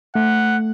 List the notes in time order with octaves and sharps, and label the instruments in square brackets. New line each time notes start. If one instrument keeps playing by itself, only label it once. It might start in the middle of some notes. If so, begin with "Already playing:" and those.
[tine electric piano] A3 [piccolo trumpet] F#5